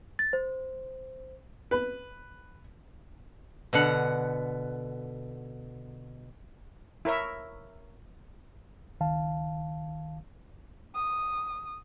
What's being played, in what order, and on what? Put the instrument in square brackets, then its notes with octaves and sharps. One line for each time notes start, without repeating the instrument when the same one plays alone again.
[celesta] A6
C5
[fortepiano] B4
[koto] B2 D3 F#5
[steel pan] E4 A#4 C#5 E5
[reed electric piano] C#2 D#3 F5 A5
[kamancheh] D#6